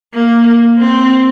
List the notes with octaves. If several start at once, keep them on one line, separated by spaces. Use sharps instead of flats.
A#3
C4